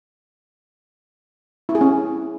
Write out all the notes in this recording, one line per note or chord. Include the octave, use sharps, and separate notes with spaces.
E4
G#4
C#4